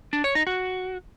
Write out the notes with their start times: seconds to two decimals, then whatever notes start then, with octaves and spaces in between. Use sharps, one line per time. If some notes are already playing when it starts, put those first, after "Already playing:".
0.13 D4
0.24 C#5
0.35 D#4
0.47 F#4